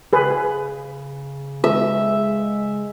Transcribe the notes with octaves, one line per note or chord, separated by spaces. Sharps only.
C#3 G#4 B4
G#3 E5